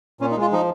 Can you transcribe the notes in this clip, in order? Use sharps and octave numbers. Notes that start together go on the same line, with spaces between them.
A#2 C#4
D#4
G#3
F4
F3 D#4